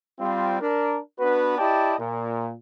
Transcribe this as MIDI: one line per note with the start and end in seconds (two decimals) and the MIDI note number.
0.20 0.61 55
0.20 0.61 60
0.20 0.61 65
0.61 0.98 62
0.61 0.98 70
1.19 1.55 59
1.19 1.55 62
1.19 1.55 66
1.19 1.55 71
1.58 1.95 64
1.58 1.95 67
1.58 1.95 74
1.58 1.95 75
1.58 1.95 79
1.58 1.95 81
1.99 2.53 46